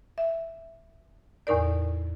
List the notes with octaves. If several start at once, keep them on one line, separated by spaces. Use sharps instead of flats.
E5
E2 A2 D#4 A#4 D5